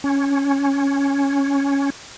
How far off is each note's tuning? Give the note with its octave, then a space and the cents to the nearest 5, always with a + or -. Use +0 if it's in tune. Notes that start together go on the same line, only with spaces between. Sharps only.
C#4 +5